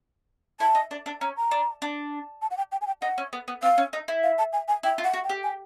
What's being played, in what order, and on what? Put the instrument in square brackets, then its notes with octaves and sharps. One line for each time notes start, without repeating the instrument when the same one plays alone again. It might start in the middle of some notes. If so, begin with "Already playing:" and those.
[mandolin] E4 [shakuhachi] A5
[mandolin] D#4
D4
D4
[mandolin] C#4 [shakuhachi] A#5
[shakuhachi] A#5
[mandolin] D4
D4
[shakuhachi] A5
F#5
G5
G5
G#5
G5
[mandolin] D#4 [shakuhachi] F#5
[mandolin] C#4
B3
B3
[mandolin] C4 [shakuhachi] F5
[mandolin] C#4
D#4
E4
[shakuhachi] F5
A5
G#5
G#5
[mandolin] E4 [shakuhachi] G5
[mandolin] F4
[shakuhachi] F#5
[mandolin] F#4
[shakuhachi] G5
[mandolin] G4
[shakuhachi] G#5